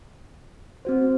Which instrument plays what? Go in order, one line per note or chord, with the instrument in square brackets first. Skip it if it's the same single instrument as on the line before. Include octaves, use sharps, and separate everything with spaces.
[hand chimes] C4 F#4 C5